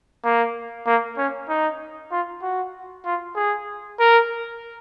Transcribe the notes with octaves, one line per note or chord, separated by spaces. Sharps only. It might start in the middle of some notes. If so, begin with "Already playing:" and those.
A#3
A#3
C#4
D#4
F4
F#4
F4
G#4
A#4